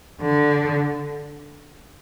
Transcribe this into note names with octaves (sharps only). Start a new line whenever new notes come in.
D3